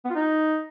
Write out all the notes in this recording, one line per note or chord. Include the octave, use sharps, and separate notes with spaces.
B3
F4
D#4